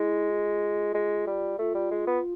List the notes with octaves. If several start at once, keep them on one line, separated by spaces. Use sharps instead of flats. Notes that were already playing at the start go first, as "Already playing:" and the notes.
Already playing: G#3 E4
F4
G#3
G3
A3 F4
G3
G#3
B3